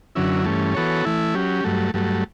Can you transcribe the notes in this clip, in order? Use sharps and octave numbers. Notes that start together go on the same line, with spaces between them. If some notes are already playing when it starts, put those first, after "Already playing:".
F#2 D3 F#3 C#4 E4
G2 E3 A3 C#4
E3 B3 F#4 A4 C#5
E3 A3 E4
F#3 C#4 G4
G2 F#3 A3
G2 F#3 A3